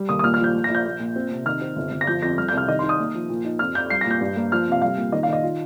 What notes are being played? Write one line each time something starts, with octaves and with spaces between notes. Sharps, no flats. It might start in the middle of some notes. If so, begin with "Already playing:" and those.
Already playing: G3
D#2 D#6
D#6
A#2 F6
F6
F3 G6
A#3
A#6
A#1
G6
A#3
A#2
C4
C3
D#3 F6
C4
G1
G1
A#6
F3 G6
F2 A#6
G3 F6
G6
C2 F6
D#3 D#5
C6
D#4
D#6
A#3
F3
A#2
D#4
F2 F6
F2 G6
G3 C7
A#6
A#2
G6
G2
A#3
F3 F6
C3 F5
G3 F5
A#2
D#3 D#5
F5
D#3 D#5
F4